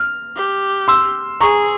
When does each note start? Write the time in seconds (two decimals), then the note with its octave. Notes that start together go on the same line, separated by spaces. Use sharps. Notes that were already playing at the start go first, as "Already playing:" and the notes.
Already playing: F6
0.36 G4
0.88 C6 E6
1.41 G#4 A#5 C#6